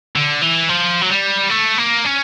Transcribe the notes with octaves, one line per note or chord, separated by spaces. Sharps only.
D3
E3
F3
F#3
G3
A3
A#3
C#4